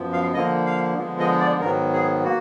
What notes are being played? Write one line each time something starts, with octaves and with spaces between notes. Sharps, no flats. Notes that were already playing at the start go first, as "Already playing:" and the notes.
Already playing: F#2 F3 B3
F5
D3 F3 A#3 D#5
F5
D3 F3 G#3 B3
D#5
D5
G#2 D#3 F#3 B3 A#4
G#4
A#3 F#4